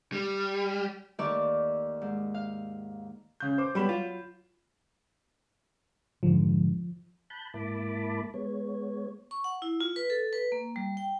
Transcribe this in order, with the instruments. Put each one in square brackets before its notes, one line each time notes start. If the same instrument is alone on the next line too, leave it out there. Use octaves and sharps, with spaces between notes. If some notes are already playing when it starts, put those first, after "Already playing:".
[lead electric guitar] G3
[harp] D#2 D#3 A3 D5 C#6 D6
G#2
F5
[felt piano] C#3 G6
C5 D6
[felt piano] F#3 B5 E7 [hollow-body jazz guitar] G3 B3
[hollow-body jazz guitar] F4
[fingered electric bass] F1 G#2 D3 [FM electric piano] F3
[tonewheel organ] A5 B5 F#6 G6
G#2 A#3 E4 A5 B5 D6
G#3 B3 C#5
[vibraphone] C#6
F#5
E4
F4
B4
A4
B4
A#3
G3
G5